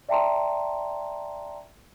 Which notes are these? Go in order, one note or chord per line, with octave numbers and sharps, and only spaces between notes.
D5 E5 G5 A5 A#5 C6